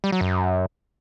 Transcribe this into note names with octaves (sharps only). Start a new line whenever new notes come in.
G3
F#3
F#2